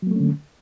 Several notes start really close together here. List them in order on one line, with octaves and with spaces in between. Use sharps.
F#3 A#3 A3 C#4 D3